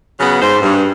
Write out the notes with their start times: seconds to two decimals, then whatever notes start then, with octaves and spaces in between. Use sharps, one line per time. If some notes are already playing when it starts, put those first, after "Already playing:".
0.19 C#3 F#3 B3
0.42 G#2 C5
0.62 G2